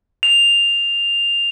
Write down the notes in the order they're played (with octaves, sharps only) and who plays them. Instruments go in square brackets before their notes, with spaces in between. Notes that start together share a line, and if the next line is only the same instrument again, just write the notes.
[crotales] F7